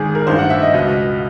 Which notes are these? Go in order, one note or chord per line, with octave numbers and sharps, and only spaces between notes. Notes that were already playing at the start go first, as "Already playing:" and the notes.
Already playing: G#1 G#2 D#3 G#4
A#4
A1 G2 D#3 C5
F#5
E5
D#5
C#2 B2 D#5